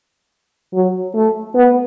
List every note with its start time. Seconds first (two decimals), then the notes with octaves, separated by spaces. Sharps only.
0.74 F#3
1.15 A3
1.55 B3